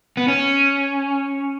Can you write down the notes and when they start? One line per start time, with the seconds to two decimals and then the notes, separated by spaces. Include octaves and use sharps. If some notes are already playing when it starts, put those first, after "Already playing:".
0.17 B3
0.28 C#4